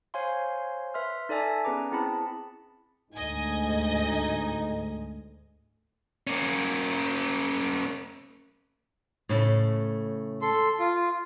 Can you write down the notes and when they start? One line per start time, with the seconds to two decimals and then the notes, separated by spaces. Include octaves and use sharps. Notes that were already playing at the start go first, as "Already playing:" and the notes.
0.14 C5 C#5 F5 G#5 C6
0.94 B4 E5 C6 F6
1.29 D#4 A4 D5 E5 G#5 A5
1.65 B3 C#4 G#4 B4 A#5 D6
1.92 C4 E4 G#4 A5 B5
3.13 D2 G#2 D#4 D#5 G#5
6.27 A#3 C#4
9.29 A2 C#3 A3
10.42 A4 C6
10.80 F4